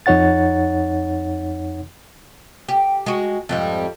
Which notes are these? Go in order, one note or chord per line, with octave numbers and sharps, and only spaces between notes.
F2 D#4 C#5 F#5 A6
G4
G#3 F#4
F2 G#2 G3